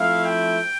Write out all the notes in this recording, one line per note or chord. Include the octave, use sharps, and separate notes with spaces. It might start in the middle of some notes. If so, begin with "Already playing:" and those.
Already playing: F3 A3 C4 E4 F5
G5